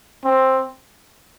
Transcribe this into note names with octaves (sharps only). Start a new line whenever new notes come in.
C4